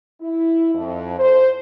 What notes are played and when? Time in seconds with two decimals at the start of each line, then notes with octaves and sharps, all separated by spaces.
0.21 E4
0.75 F2
1.18 C5